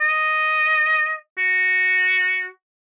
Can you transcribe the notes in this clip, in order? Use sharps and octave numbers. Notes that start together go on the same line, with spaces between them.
D#5
F#4